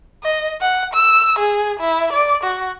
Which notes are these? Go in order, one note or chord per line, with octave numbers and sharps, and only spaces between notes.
D#5
F#5
E6
G#4
E4
D5
F#4